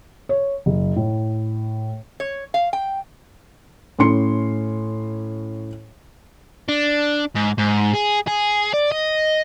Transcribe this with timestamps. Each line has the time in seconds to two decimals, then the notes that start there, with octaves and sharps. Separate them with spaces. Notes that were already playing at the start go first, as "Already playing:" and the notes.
0.29 C#5
0.66 F#1
0.96 A2
2.20 C#5
2.54 F5
2.73 G5
3.99 A2 C#4 C6 C#7
6.69 D4
7.36 G#2
7.59 G#2
7.94 G#4
8.28 G#4
8.74 D5
8.92 D#5